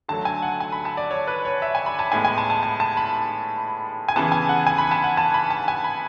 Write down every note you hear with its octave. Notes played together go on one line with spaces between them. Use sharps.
D3 F#3 A3 A5
G#5
F#5
G#5
B5
A5
D5
C#5
B4
C#5
E5
G#5
B5
A5
A2 G#3 B3 G#5
G#5
A5
A5
A5
A5
B5
G#5
C#3 E3 B3 A5
G#5
F#5
G#5
B5
A5
F#5
A5
B5
A5
G#5
B5